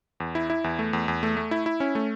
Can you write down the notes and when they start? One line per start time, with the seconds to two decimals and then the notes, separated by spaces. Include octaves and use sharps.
0.20 E2
0.35 E4
0.50 E4
0.64 E2
0.79 A3
0.93 E2
1.08 E2
1.23 A3
1.37 A3
1.51 E4
1.66 E4
1.80 C#4
1.95 A3